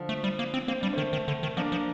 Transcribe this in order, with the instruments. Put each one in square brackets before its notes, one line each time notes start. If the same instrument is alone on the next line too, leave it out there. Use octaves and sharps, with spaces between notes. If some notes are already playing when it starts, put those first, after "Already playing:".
Already playing: [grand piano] D3 F3
[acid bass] A3
G3
A#3
C4
[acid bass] A#3 [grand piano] C4
[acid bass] G3 [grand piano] D4
[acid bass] D#3 [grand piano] A3 C4
[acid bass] D#3
D3
D#3
[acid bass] F3 [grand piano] A#3 D4
[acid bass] F3